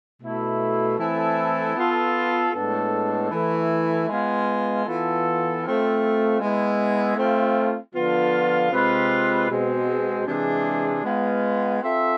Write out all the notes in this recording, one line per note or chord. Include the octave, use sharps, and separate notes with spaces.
B2 A3 E4
E3 A3 C4 E4 A4
B3 F4 A4
A2 G#3 B3 D4 A4
E3 A3 E4
G#3 B3 F4
E3 B3 F4 A4
A3 C4 F4
G#3 B3 E4
A3 C4 F4
D3 F3 B3 F4
C3 G#3 C4 F4 B4
B2 G#3 C4
C3 E3 G#3 D4 G#4
G#3 B3 F4
C4 F4 A4 E5